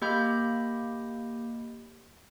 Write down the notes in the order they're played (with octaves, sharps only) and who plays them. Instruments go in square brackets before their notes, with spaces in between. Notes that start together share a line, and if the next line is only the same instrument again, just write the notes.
[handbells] A#3 G4 D#5 B5 G6